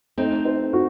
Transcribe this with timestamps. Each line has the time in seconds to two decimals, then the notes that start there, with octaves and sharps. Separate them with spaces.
0.18 A3 C4 D#4
0.45 C5
0.73 F#4